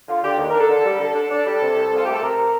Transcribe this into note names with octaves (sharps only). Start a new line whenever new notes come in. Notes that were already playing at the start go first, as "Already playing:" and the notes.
D3 F4
D3 G4
D#2
D4 A#4
A4
D3
G3
D3 A4
D4
D4
G3
C3
C2
C2
F4
A3 G4
A4
C3 A#4